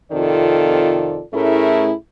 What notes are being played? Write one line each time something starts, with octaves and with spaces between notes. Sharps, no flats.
F2 C3 D#3 F4 A4 D5
A2 A3 C#4 E4 G#4 A#4